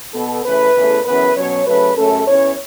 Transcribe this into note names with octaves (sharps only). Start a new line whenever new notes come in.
B2 B3 A4
C#3 E3 A3 B4
E2 C#3 E3 A3
F#2 C#3 E3 B3 B4
B2 F#3 C#4 C#5
C#3 F#3 A3 B4
F#2 C#3 A3 C#4 A4
E2 E3 C#4 C#5